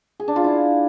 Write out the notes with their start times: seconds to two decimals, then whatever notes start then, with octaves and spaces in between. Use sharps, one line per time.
0.20 G#4
0.28 D4
0.36 F4
0.44 E4